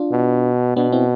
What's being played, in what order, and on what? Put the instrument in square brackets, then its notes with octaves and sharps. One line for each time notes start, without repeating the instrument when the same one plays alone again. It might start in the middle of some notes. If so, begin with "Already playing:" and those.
Already playing: [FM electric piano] D4 F4
[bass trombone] B2
[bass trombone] B2 [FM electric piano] B3 D4
[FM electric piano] C4 E4